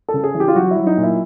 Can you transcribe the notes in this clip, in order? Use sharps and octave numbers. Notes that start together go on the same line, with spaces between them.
A4
C#3
G#4
E3
G4
F4
F#3 F#4
E4
F#3
D#4
A#2
E4